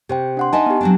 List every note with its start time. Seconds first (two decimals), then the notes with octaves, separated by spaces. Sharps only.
0.09 C3 G4 C5 G5
0.37 D4 F#5 C6
0.53 D#4 D#5 E5 G#5 A5
0.66 B3 G4
0.81 F#3 C4 D4